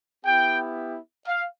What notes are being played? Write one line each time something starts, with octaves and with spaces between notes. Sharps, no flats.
B3 E4 G4 G5
F5